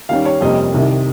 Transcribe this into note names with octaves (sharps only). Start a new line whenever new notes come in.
D#2 D#3 G3 C#4 F5
C#5
F2 C3 G3 A#3 C#4 D#5
C2 C3 D#3